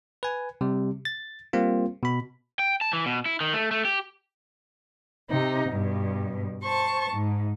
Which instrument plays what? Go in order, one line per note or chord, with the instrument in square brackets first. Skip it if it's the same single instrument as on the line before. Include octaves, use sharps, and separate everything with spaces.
[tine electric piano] B4 G#5
C3 G3
A6
G3 A#3 C4 F4
B2 B5
[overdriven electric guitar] G5
A5
E3
B2
E4
D#3
A3
A3
G4
[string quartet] C3 D#4
G2 B2
C5 A5 C#6
G#2